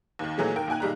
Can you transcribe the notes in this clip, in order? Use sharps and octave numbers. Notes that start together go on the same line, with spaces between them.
D#2 D#3
A#2 E3 F#3 G#3 A3
D#2 A#4 G5
A#2 D#3 G5 G#5 F#6
B1 A#2 D#3 G3 G#3 A#5